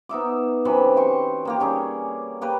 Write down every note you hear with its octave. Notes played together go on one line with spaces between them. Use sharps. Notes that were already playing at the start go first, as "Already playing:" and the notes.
B3 D#4 E5 D6
F#2 C3 E3 B5
G5 C6 C#6
D#3 A#3 G4
G3 C#4 G#4
A#3 G4 B4